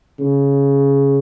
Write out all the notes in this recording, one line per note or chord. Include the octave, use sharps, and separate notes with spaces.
C#3